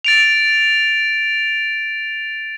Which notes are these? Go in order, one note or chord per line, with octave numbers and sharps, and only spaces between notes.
A6 D7 F7